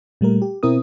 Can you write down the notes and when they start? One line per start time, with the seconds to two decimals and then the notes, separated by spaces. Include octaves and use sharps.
0.21 A#2 G3 A3 A#4
0.42 G4
0.63 B2 C4 E4 A#4 D#6